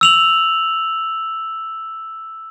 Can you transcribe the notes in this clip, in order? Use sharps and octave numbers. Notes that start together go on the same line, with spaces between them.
E6 F7 F#7